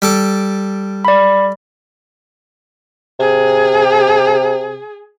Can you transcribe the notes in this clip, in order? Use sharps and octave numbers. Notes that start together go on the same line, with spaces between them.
G3 A4 D6
D5 B5
C3 G#4